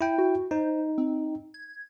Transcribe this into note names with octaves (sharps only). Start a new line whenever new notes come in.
E4 G5
F#4
D#4 C5
C4
G#6